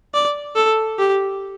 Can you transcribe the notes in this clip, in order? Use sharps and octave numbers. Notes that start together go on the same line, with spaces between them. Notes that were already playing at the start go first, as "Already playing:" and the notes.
D5
A4
G4